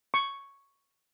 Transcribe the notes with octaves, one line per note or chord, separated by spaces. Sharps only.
C#6